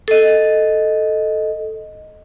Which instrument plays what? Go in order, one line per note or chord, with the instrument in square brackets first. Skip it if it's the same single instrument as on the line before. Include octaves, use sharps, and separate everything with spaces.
[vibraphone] A4 D#5